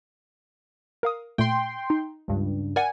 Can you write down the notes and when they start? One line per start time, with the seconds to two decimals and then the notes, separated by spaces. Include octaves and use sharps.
1.03 A#4 F5 D#6
1.38 A#2 A3 G5 C6
1.90 D#4
2.28 C#2 G2
2.76 A#4 D5 F#5 G#5